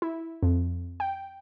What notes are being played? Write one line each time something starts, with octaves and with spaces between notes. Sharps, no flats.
E4
F2
G5